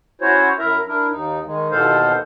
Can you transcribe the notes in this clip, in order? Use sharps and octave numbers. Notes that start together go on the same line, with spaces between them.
C#4 E4 F#4 C5 C#5
F#2 E4 A#4 E5 A#5
D4 E4 A#4
D#2 D#4
D#3 G#3
D#2 B2 E3 A4 C5 F5